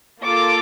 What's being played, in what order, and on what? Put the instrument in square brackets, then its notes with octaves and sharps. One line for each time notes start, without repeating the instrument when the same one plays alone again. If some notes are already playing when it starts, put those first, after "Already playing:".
[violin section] A#3 F4 A4 D6